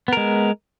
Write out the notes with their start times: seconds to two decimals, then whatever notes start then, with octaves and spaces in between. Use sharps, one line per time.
0.08 B3
0.13 A#4
0.17 G#3